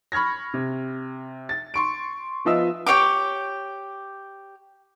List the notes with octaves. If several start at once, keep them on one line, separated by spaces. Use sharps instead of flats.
B5 C#6 F6 G#6 A#6
C3
A6
C6 C#6 D7
F3 B3 F4 D#5 E5 E6
G4 C#5 F5 D6